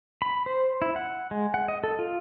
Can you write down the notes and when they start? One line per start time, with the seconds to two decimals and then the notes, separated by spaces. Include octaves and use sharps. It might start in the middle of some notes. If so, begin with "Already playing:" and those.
0.22 B5
0.46 C5
0.82 E4
0.96 F#5
1.31 G#3
1.54 F#5
1.68 D#5
1.84 A4
1.99 F4